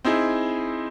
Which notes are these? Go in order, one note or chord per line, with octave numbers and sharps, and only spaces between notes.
C4 D#4 E4 G#4